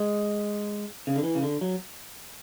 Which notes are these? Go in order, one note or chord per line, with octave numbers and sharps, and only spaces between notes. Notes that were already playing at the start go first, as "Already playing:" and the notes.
Already playing: G#3
C#3
D3
E3
C#3
D3
F#3